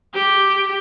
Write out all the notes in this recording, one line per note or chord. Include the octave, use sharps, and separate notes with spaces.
G4